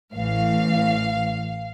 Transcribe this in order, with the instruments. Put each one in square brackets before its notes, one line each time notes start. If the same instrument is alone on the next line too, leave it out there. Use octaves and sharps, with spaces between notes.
[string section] A1 A2 E3 F5